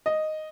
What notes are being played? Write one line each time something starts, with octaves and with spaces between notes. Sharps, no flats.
D#5